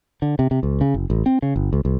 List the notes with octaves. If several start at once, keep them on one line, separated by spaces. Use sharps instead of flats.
D3
C3
C3
C#2
C#3
F#1
A1
C4
C#3
G1
C#2
C2